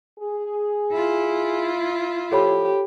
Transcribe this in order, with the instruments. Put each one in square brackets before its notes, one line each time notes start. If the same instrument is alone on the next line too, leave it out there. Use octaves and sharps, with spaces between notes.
[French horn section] G#4
[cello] E4 F4
[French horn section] A2 F3 [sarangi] G4 [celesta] A4 C#5 B5